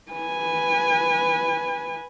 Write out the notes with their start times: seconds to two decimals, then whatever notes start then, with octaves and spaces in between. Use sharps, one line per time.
0.12 B4 G#5